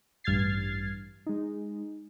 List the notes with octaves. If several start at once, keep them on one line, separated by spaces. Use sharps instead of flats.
A1 G2 F6 G#6 A6 C7
G#3 D#4